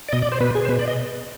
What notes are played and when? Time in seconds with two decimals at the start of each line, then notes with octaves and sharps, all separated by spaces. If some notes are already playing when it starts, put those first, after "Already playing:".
0.08 D5
0.13 B2 D#5
0.22 D5
0.32 C5
0.40 B2 B4
0.55 G#4
0.65 C5
0.69 B2 B4
0.79 D5
0.88 D#5